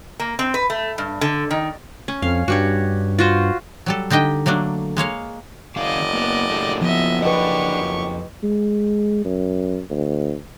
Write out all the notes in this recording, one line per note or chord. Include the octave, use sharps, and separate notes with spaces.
A#3
C4
B4
A3
G2
D3
D#3
C#4
F2 F5
G2 F#4 G4 C#5
F4 F#4 C5
F#3 G3 A4
D3 D#4 G4 D#5 G5
F#3 A3 A#3 D4
G#3 A#3 C#5 F5
F#1 D#3 C#4 D5 D#5 F5
A#3 B3
A3 D4 G4
F3 B3 D#5 E5
D4 G4 B4 D#5 F#5 C#6
F2
G#3
F#2
D2